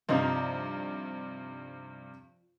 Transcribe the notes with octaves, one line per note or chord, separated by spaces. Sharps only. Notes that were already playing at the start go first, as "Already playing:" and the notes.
G2 C3 F3 D#4 F4